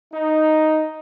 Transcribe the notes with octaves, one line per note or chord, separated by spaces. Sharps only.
D#4